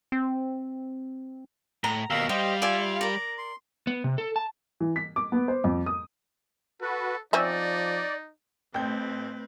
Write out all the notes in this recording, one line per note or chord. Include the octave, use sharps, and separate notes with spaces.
C4
A2 A#5
D#2 B2 A#4 F5 E6
G3 G4 C5 D#5 F5
F4 D5 E5 G#5
A#4 D5 A#5
C6
B3
C3
A4
A5
E3
B6
D6
B3
C5
F2
D#6
F#4 A4 B4
F3 C4 C#4 D#4 D5 E5
A1 A3 C4 B4 G5 G6